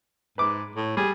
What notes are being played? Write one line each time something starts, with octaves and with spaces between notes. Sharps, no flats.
G#2 B4 D6
A2
G3 G#4